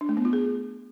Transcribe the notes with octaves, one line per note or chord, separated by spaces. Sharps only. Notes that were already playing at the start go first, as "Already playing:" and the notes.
D4
A3
B3
F4
G#4